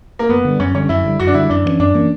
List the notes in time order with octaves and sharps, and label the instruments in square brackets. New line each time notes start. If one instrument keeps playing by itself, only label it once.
[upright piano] A#3
[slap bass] F#2 [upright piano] B3
[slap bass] D3 G3
[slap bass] F#2 [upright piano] C#4
[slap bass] D3 G3 [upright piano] C#4
[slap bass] F#2 [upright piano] E4
[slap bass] D3 G3
[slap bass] F#2 [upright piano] F#4
[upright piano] D4
[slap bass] D3 G3 [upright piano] E4
[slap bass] F#2 [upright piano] D4
[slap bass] E3 A#3
C#4
[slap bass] F#2 [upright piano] D4
[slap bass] E3 A#3 C#4